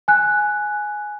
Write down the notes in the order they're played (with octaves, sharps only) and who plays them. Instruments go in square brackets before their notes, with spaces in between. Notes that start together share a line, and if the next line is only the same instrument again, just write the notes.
[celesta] G#5 F#6